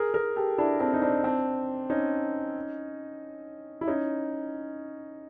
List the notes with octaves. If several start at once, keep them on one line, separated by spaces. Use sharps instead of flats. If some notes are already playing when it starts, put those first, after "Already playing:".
Already playing: G#4 A#4
G#4 A#4
G4 A4
D4 E4
C4 D4
D#4
C4 D4
C4 D4
C#4 D#4
E4
C#4 D#4